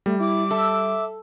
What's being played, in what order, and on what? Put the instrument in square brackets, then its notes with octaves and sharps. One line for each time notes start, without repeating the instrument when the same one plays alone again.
[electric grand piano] G3 [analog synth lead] A3
[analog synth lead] E4 [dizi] D6
[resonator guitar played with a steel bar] A4 [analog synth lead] E5